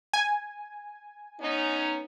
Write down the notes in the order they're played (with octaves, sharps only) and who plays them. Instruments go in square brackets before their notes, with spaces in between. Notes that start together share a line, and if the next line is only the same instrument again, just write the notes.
[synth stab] G#5
[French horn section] B3 C#4 D#4